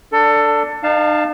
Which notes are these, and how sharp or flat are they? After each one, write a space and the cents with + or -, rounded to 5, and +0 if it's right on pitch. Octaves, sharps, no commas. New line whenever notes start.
D4 +0 A4 +20
D#4 -45 F5 +0 A5 +0